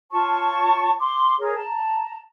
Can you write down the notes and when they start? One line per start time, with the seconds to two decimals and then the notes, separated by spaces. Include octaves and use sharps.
0.11 F4 C#5 A5 C#6
0.99 C6 D6
1.39 G#4 A#4 C#5
1.55 A5 A#5